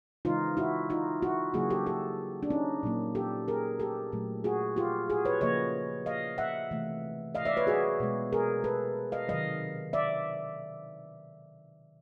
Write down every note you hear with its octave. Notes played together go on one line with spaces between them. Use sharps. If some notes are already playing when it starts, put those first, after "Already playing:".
C#3 E3 G#3 D#4 F4
E4 F#4
D#4 F4
E4 F#4
C#3 F#3 A#3 F#4 G#4
G4 A4
G4 A4
D4
C#4 D#4
A#2 F#3 A#3
G4 A4
G#4 A#4
G4 A4
A#2 F#3 A3
F#4 G#4
F4 G4
F#4 G#4
B4 C#5
C#3 F3 A#3 C#5 D#5
D#5 F5
E5 F#5
C3 E3 A3
D#5 F5
D5 E5
B4 C#5
F#4 G#4
B2 G#3
G#4 A#4
A4 B4
D#5 F5
C3 D#3 F#3 D#5 F5
D5 E5